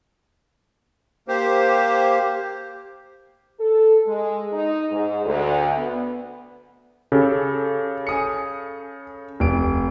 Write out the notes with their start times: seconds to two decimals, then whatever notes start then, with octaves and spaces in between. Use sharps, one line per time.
1.28 A#3 G4 C5
3.59 A4
4.07 G#3
4.52 D#4
4.91 G#2
5.24 D2
5.77 B3
7.12 C#3 G4 A4
8.07 G#5 D#6 C#7
9.40 F1 D7